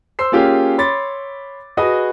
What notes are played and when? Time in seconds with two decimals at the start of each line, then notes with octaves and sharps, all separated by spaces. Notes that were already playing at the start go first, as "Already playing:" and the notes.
0.19 C5 C6 E6 C7
0.32 A#3 C#4 F4 G4 G#4
0.78 C#5 B5 C6 D6 A6
1.77 F#4 G#4 B4 D#5 D#6